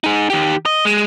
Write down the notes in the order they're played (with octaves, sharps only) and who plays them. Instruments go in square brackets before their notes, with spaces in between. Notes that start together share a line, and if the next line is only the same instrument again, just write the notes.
[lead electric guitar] D#4 G#4
D#3 G4
D#5
G#3